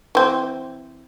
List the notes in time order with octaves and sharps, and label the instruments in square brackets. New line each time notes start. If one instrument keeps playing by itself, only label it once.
[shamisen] E3 C4